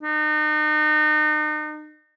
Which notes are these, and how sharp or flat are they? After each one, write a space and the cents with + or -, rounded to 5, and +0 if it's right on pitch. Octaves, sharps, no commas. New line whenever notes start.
D#4 -40